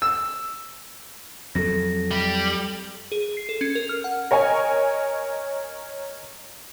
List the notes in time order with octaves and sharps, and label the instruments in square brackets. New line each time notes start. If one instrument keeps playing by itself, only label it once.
[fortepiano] E6
[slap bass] F2 F#3 [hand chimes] A4 A#6
[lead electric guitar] G3
[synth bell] G#4
C7
A4
C#4
A#4
F6
F#5
[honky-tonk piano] A#4 C#5 D#5 G#5